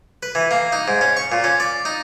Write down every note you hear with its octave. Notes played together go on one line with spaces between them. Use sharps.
B4
E3
A#3
D#4
G#2
C#4
C#6
A#2
C#4
D5
D#4